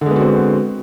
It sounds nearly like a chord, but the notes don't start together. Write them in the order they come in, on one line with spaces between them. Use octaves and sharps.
D3 G#3 B3 F#4 C4